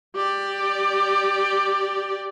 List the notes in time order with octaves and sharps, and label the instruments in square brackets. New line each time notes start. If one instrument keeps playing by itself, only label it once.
[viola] G4 D5